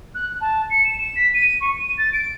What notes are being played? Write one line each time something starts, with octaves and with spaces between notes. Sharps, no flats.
F#6
A5
C#7
E7
E7
B6
D#7
C#6
D#7
A6
D7